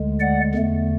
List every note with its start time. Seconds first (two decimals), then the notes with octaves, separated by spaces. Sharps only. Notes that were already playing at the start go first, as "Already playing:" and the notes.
Already playing: D2 D3 G#3
0.20 D5 F#5
0.55 E2 D3 A3